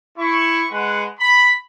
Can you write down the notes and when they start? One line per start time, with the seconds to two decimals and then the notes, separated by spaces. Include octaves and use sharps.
0.18 E4 C#6
0.70 G#3 B4 F#5
1.19 B5